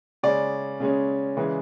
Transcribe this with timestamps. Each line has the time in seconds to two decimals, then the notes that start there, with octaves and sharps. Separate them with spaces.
0.23 C#3 G#3 C#4 D5
0.80 C#3 G#3 C#4
1.37 C#3 E3 G#3